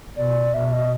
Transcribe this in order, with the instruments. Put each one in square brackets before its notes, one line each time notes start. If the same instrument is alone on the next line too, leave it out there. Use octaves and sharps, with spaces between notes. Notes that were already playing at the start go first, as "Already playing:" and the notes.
[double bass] B2 [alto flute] D5
[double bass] B2 [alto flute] E5
[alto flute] D#5